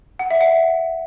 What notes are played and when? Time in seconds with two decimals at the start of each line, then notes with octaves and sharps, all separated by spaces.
0.19 F#5
0.31 E5
0.41 F#5